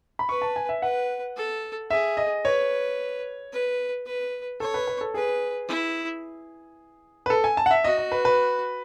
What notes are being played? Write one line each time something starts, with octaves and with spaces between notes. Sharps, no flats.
B5
B4 C#6
A5
G#5
E5
B4 F#5
A4
G#4 E5
D#5
B4 C#5
B4
B4
A4 C#5
B4
B4
A4
G#4 B4
E4
B4
A4
G#5
A5
F#5
E5
F#4 D#5
D#5
B4
B4